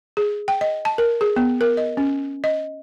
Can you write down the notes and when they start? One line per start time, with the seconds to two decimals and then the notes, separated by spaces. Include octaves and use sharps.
0.17 G#4
0.48 G5
0.61 D#5
0.85 A5
0.98 A#4
1.21 G#4
1.36 B3
1.61 A#4
1.77 D#5
1.97 C#4
2.44 D#5